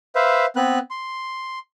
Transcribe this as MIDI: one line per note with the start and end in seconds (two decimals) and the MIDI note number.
0.16 0.46 71
0.16 0.46 72
0.16 0.46 76
0.16 0.46 77
0.56 0.79 59
0.56 0.79 60
0.56 0.79 71
0.56 0.79 90
0.91 1.59 84